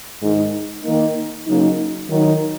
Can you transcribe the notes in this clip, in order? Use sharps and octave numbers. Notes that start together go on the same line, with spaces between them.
G#2 D#3 G#3 D#4
D#3 A#3 D#4
C#3 F#3 A#3 D#4
D#3 F#3 D#4